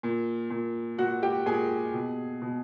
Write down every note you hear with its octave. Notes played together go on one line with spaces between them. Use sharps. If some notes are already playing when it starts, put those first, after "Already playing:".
A#2
A#2
A#2 F#4 F#5
G4 G5
A#2 G#4 G#5
B2
B2